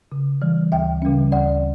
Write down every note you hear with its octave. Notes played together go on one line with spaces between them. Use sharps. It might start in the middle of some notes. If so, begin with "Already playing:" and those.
C#3
E3 G3
D2 E5 G5
C#3 G3 C#4
D2 D5 F#5